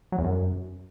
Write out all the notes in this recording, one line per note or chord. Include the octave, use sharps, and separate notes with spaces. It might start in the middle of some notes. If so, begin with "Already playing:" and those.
F#3
E2
F#2